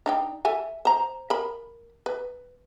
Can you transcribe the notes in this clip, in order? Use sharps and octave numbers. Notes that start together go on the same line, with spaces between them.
D4 D#4 G5
A4 E5 G#5
C5 A#5
A#4 B5
B4